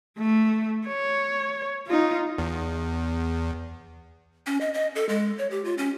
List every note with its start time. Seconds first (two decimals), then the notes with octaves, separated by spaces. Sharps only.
0.19 A3
0.87 C#5
1.87 D#4 F4
2.38 E2
4.46 C#4
4.61 D#5
4.74 D#5
4.95 A4
5.09 G#3
5.38 C#5
5.51 G4
5.65 F4
5.78 C#4